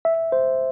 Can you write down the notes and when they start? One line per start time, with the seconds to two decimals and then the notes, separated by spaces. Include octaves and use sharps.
0.05 E5
0.32 C5